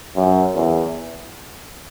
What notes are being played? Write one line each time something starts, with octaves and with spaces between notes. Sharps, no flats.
F#2
E2